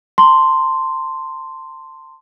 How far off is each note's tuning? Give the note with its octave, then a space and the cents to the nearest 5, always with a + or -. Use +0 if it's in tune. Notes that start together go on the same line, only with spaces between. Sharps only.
A5 +35 C6 +0